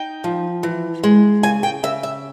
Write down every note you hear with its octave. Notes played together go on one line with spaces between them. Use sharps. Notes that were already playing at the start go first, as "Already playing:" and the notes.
Already playing: D#4 G5
F3
E3
G#3
C#3 G#5
G5
C#3 E5
E5